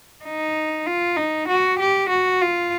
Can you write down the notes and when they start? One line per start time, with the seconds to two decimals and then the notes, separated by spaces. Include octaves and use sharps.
0.24 D#4
0.86 F4
1.17 D#4
1.48 F#4
1.79 G4
2.10 F#4
2.41 F4